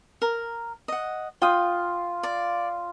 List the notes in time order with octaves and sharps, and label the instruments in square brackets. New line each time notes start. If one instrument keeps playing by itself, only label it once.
[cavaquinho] A#4
D#5 F#5
[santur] F4 [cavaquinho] G5 D#6
[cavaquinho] D5